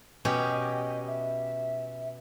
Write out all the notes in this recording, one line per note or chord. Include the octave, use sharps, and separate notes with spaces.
B2 C#4 G4 D#5
E5